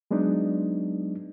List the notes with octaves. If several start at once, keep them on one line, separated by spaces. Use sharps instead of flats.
F#3 G#3 B3 D4 D#4